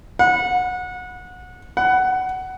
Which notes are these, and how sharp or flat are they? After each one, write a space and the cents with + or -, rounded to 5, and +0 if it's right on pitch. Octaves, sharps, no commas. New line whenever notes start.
F#5 -25
F#5 +15